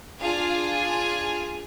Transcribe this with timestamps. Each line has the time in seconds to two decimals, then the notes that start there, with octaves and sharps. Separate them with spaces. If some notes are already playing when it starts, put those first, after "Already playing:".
0.20 D4 F4 G#4 F5
0.81 G#5